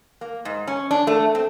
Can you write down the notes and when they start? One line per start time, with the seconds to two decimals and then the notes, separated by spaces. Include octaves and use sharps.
0.21 A#3
0.45 G#2
0.67 C#4
0.91 D4
1.07 A3
1.35 C4